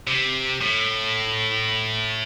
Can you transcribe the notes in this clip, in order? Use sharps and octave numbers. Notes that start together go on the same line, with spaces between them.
C3
A2